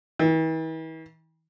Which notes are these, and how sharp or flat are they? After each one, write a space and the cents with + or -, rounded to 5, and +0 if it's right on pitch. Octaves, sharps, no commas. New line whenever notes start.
E3 -45